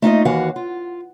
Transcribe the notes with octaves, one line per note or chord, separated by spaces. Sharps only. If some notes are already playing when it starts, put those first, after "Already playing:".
A3 D#4 F4 D#5
D#2 E3 F#4 F5 F#5
F4